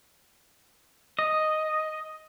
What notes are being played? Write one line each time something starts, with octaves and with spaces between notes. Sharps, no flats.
D#5